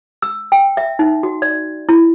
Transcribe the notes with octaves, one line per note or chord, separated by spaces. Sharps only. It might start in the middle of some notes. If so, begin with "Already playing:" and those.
E6
G5
E5
D#4
F#4
D5
E4